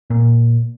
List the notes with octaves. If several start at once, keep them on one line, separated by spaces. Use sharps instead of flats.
A#2